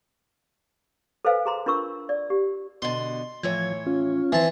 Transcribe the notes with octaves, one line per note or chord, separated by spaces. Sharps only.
A4 B4 C5 F5 G#5
G#4 A#5 C6
D4 F4 A#4 C#6 E6
D5
G4
B2 D3 C6
A2 E3 F3 C#5 G#6
C#4 F4
E3 C4 C5 A5